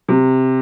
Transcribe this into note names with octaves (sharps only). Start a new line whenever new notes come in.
C3